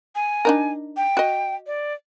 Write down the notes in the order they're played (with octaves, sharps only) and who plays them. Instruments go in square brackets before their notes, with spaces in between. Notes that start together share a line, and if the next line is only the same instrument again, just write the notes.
[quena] G#5
[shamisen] D4 D#4 A#4
[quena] G5
[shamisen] F#4 D#5
[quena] D5